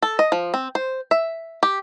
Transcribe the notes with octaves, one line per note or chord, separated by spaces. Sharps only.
A4
D#5
F3
C4
C5
E5
G4